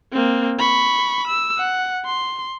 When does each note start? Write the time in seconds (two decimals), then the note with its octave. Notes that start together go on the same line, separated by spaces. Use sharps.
0.12 A#3 C4
0.59 B5 C#6
1.27 E6
1.58 F#5
2.06 C6